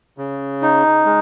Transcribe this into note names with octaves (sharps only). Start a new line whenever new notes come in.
C#3
D#4
G#3